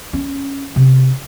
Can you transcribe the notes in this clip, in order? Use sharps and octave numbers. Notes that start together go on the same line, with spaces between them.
C#4
C3